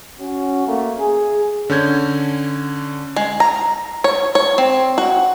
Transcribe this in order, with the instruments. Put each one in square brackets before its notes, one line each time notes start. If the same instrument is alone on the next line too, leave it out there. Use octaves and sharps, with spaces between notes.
[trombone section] C#4 F#4
A3 A#3
G#4
[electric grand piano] D3 C#4 G6 G#6
[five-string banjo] G#3
A#5
C#5
C#5
C4
F#4